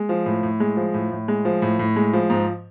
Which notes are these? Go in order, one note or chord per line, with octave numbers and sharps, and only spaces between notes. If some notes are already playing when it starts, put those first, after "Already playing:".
Already playing: G#3
F3
A2
A2
G#3
F3
A2
A2
G#3
F3
A2
A2
G#3
F3
G#2